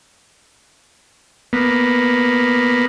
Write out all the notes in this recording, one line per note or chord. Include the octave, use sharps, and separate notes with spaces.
A#3 B3